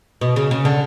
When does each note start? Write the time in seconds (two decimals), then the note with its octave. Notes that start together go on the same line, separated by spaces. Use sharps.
0.21 B2
0.36 C#3
0.51 C#3
0.65 D3